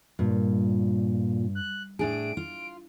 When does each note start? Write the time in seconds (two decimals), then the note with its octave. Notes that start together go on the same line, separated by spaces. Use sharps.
0.19 G2 A#2
1.55 F#6
1.99 A2 D4 G#4 D7
2.37 F4